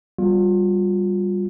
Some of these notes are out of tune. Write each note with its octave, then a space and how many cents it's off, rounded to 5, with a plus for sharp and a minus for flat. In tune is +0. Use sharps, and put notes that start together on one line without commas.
G3 +0 B3 -15 F4 +30